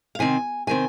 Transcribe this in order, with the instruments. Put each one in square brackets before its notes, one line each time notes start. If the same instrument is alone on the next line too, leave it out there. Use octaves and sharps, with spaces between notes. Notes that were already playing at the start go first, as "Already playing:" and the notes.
[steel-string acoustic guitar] F5
C3 D#3 C4 G#5
C3 D#3 C4 G#5